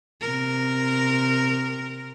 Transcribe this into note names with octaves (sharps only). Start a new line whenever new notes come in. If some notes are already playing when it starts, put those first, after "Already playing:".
C3 A#4